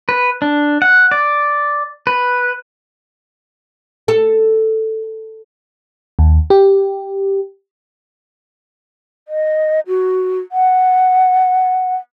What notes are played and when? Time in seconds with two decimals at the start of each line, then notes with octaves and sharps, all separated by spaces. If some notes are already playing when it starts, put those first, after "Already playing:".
0.09 B4
0.42 D4
0.82 F#5
1.11 D5
2.07 B4
4.08 A4
6.19 D#2
6.50 G4
9.28 D#5
9.87 F#4
10.52 F#5